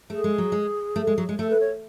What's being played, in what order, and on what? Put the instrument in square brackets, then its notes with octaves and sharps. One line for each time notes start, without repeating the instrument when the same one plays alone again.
[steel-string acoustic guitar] A3 [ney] G#4
[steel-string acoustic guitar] G#3
F#3
G#3
A3
G#3
F#3
G#3
[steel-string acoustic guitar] A3 [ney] A4
[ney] B4
C#5